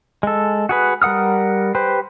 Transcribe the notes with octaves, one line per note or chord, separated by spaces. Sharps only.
G#3 A4
F#4 G#4 B4
G3 A#4 F#5 D#6 F6
G4 B4 C5